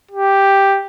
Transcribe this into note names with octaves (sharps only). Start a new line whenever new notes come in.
G4